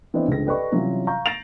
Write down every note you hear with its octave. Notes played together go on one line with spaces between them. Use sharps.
E3 B3 C4 D4 B4 D#5
C#2 G2 D3 G#3 C4 A#6
G4 A4 B4 D5 D#5 C#6
C3 E3 F#3 G3 C#4 F4
F5 A#5 C#6 G6
A6 A#6 C7 D7 F7 F#7